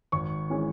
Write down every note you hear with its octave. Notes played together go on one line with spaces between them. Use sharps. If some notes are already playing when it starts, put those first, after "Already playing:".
G#1 C#6
E3 G#3 C#4